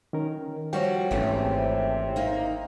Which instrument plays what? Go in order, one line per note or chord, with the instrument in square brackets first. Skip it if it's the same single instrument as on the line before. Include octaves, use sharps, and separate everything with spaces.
[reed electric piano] D#3 C#4 A#4
[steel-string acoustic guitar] F3 G3 F#4 [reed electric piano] C#5 G5
[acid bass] G#1 [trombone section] C3 C4 [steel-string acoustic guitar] E3 A3 C#4
[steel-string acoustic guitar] A#3 D#4